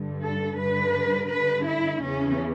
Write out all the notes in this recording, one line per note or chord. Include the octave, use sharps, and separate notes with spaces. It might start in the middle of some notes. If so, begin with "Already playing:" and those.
Already playing: G2 D3
A4
G2 D3 B4
G2 D3 B4
E4
E2 C#3 E3 C#4